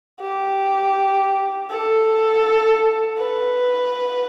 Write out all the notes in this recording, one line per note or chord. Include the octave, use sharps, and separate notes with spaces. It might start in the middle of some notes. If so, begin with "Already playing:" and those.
G4
A4
B4